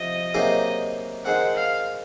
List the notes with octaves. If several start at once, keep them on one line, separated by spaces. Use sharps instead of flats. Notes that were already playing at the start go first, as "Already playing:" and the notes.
Already playing: C3 F3 D#5
C3 F#3 A#3 D#4 G#4
D#3 G#3 C4 F#5
F5